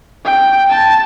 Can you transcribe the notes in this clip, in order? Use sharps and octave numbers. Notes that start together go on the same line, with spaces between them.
G5
A5